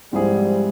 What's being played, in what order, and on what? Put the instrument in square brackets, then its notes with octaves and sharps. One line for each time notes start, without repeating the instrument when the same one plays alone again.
[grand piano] G#2 F3 C4 E4 G#4 [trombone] G3